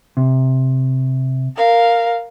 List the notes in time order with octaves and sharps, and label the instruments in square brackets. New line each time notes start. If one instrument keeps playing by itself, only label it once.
[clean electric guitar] C3
[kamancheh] A#4 F5